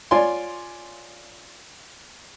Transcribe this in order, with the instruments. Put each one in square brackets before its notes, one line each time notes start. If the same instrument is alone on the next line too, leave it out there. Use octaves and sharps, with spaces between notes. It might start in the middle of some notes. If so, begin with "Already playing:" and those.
[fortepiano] F4 C#5 D5 G#5 C6